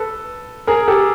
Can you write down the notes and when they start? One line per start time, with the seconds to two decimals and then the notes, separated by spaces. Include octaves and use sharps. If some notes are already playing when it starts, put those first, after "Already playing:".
Already playing: A4 B4
0.67 G#4 A#4
0.88 G4 A4